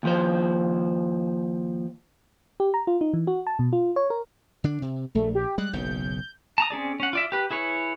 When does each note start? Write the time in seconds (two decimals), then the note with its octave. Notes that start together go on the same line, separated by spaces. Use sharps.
0.03 D#2 F3 C5
2.60 G4
2.74 A#5
2.87 F4
3.01 D#4
3.13 E3
3.27 F#4
3.47 A5
3.59 B2
3.73 F4
3.96 C#5
4.10 A#4
4.64 D3 D4
4.82 C3
5.15 A#1 A3
5.35 G4
5.58 G3 G#3 F#6
5.73 F#1 B1 C#3 G6
6.58 A5 A#5 D#6
6.70 C4 C#4 G#4 D5
7.00 C#4 F#5
7.13 F4 D5 E5
7.32 G4 B4
7.50 E4 G#4 B4 C#5